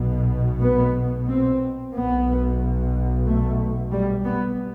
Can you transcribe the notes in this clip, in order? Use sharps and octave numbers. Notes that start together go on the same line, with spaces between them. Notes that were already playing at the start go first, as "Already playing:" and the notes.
Already playing: B1 B2
B3
C4
B1 B2 B3
A3
G3
B3